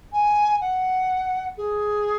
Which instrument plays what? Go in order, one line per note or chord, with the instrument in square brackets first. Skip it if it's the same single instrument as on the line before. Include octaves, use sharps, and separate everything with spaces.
[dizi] G#5
F#5
G#4